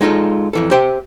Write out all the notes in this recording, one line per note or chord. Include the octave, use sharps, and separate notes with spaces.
G#3 D#4 F4 A4
F2 E3 A4
G4 C5 E5 G5